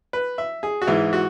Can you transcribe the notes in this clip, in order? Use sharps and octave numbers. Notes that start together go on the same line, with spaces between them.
B4
E5
G#4
F#4
G#2 E3 G#3 E4
F#4